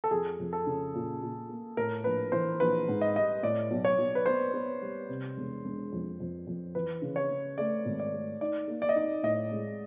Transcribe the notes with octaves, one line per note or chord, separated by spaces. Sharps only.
A4
F2 G#4
F2
A4
C#3
A#2
A#2
A#3
A2 A#4
A#1 B4
E3 C5
A#1 B4
G#2
D#5
G3 D#5
A2 D5
B1
C#5
B1
B4
B3 C5
B3
G3
C3
E1
E1
F2
F2
F2
E3 B4
C#3
C#5
C#3
A3 D5
G#1
D5
A3
D#4 D5
A#3
D5
D#5
D#4 D5
A2 D#5
G#3